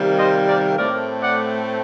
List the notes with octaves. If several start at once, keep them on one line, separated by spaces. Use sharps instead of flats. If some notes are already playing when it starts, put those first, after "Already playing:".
Already playing: C3 D#3 G3 A#3
C5 D#5
A#4 D5
A2 A3 C4 A#4 D5
D5 F#5